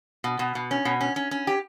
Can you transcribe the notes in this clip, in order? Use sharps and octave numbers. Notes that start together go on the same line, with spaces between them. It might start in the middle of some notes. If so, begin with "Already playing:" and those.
B2
B2
B2
C#4
B2
C#4
C#4
C#4
G4